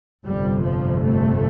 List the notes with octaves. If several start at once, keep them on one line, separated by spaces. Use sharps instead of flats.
G1 F2 C3 G3
F3
A3